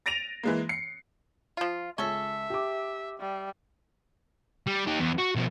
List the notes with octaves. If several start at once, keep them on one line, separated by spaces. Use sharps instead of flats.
A6 A#6 D7 D#7 F7
E3 G#3 A#3
C7 C#7
F3 F4
C#2 C#4 A4 E5 G7
G4 D6
G3
G3
D#4 G4
E2
F#4
B2 F3